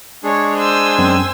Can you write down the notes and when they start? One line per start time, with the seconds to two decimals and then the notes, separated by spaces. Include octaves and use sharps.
0.24 G#3 D4 G#4 C#5
0.56 C5 G#5 E6
0.99 F#2 C4